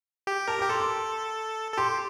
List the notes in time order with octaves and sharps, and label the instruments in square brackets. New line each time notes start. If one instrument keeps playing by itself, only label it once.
[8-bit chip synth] G4
[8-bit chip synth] A#4 [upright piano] A5
[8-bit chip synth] G4 [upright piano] D6
[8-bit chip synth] A4 [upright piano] C6
[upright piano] C6
[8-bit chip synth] A4
[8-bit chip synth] G4 [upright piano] C6